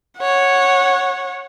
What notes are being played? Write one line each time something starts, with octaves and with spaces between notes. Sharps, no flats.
C#5 F#5